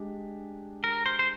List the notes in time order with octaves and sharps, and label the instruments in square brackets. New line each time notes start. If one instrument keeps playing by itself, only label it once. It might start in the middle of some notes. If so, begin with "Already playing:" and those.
Already playing: [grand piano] G#3 D4 G4
[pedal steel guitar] A#4
C5
C5